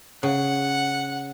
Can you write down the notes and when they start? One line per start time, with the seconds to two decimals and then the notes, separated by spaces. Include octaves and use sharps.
0.23 C#3 F#5